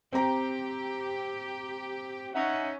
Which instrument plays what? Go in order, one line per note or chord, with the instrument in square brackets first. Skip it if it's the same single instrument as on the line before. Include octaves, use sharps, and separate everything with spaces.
[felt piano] C4 A#5 [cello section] G4
[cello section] C#4 [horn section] D#4 E5 F#5